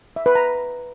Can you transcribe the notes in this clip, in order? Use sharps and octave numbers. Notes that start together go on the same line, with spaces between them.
E5
B4
A#5